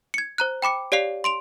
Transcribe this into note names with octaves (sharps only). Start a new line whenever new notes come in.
G#6 C#7
C5 A#5 F#6
G5 B5 D6 C#7
G4 C#5 D5 F5 C7 F7
C6 D7 F7